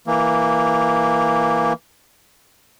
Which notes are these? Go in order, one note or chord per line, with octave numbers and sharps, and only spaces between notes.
E3 A#3